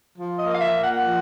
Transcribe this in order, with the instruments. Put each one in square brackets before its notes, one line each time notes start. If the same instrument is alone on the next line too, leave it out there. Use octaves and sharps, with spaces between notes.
[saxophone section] F3
D#5
A#3
F5
E5
A#2
F#5
F#5
F3